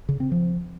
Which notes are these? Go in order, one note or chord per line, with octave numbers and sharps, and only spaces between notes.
C#3
C4
F3